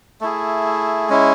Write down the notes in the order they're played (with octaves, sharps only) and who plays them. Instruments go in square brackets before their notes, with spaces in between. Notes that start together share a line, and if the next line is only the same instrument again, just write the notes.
[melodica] A3 E4 G#4
G#3 C#4 E4